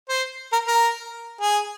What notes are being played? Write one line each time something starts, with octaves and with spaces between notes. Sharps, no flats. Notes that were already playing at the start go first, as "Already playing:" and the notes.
C5
A#4
A#4
G#4